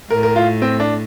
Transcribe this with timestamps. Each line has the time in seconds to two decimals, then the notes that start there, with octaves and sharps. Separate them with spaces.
0.10 A2 A#4
0.23 A#4
0.36 F4
0.62 C4
0.80 D4